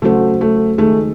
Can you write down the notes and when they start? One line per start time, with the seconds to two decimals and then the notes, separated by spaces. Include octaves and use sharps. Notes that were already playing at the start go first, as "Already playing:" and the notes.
0.02 C#3 F#3 A3 C#4 F#4 C5
0.41 A3
0.78 D#3 G#3 A3 D#4 G#4